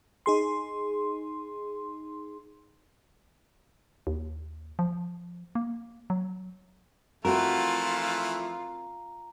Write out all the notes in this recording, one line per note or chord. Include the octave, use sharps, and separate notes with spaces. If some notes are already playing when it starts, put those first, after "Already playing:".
D#4 G#4 C6
D#2
F3
A#3
F#3
E3 F3 A3 C4 F4 F#4 A#4 A#5